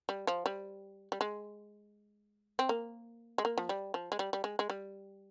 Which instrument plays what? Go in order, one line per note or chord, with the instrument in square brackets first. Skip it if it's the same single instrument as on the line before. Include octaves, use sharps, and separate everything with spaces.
[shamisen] G3
F3
G3
G3
G#3
C4
A#3
G#3
A#3
F3
G3
F3
G#3
G3
G3
G#3
G#3
G3